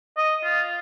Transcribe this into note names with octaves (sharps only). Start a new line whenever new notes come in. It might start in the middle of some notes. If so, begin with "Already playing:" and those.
D#5
F4